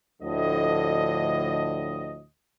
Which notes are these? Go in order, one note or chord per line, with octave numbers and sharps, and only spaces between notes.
D2 A2 D3 F3 D#5